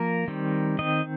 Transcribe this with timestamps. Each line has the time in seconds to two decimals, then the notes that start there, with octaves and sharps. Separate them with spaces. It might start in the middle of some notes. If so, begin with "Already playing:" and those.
Already playing: F3 A#3 A#4
0.28 D#3 G3 C4
0.79 D#3 C4 D#5